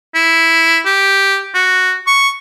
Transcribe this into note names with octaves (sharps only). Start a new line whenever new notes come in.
E4
G4
F#4
C#6